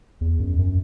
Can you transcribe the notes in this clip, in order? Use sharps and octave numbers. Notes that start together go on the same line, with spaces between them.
E2
F#2
F#2